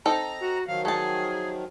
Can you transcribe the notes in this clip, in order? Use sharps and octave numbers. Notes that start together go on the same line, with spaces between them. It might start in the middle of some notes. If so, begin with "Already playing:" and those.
C4 D#4 A4 A#5
F#4
D#3 F3 F#3 F5
A3 G#4 A5